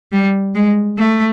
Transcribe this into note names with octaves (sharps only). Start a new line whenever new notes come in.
G3
G#3
A3